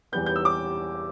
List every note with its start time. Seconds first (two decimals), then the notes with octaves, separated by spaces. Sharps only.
0.12 E2 E3 G3 B3 G6
0.26 G6
0.36 E6
0.45 D6